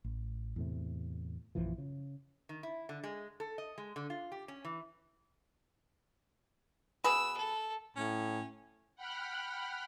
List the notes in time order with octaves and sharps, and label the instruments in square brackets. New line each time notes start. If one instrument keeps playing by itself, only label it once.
[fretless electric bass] A1
E2 A2 C3
A#1 F#2 E3 F3
C#3
[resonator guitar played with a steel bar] D#3
E4
D3
G#3
A4
D#5
G#3
D3
F4
G4
C#4
E3
[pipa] B2 G#4 B4 [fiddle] E6
[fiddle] A4
[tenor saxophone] A2 [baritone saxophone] C#4
[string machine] F#5 G5 B5 F6 F#6